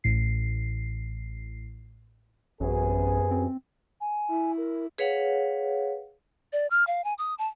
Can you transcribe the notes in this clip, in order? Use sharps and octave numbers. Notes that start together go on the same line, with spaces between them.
A1 A2 C7
A1 F#2 C3 B3 G#4
C4
G#5
E4
A#4
G#4 B4 C#5 F5 F#5
D5
F6
F5
G#5
D#6
A5